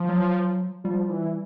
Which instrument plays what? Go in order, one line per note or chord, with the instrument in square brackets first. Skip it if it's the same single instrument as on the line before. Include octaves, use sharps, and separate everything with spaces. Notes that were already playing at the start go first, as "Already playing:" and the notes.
Already playing: [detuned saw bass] F3
[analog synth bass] F#3
[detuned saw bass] F3 [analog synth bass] G3
[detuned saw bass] E3